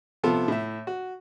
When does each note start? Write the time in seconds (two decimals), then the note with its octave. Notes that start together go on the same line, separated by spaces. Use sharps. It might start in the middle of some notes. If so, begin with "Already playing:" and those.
0.23 C3 F3 B3 F4 A4
0.48 A2 E5
0.87 F#4